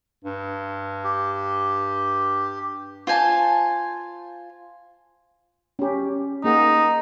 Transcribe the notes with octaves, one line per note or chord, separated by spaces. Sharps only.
G2
G4
F4 C5 G#5 A5
C#4 G4
A#3 D#4 G#4 F#5